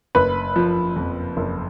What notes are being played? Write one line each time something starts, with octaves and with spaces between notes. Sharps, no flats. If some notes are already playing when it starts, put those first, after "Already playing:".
F#1 B4 B5
F3
F2
F#1